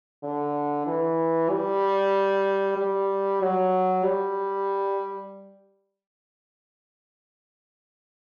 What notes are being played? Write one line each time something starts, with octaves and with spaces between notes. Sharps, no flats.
D3
E3
G3
G3
F#3
G3